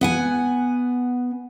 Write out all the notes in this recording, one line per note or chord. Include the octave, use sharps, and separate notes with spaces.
B3 F#5 G#5